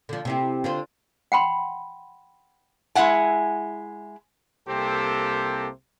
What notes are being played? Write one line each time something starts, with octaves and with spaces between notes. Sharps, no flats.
D3 F3
C3 C4 E4
D3 F4 C5
F#5 G5 B5 C6
G#3 E4 E5 F#5 G#5
C2 C3 A#3 C4 G4 A4